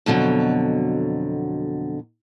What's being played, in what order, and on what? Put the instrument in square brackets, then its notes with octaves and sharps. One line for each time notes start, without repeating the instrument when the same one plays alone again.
[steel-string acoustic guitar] F2 B2 D3 F#3